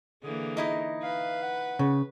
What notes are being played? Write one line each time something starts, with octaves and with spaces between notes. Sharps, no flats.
D3 E3 A#3 G#4
D#4 E4 D#5
B4 F5
F#5
C#3